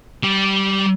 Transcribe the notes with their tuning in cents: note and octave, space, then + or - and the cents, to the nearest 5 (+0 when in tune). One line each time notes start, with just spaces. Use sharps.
G3 -15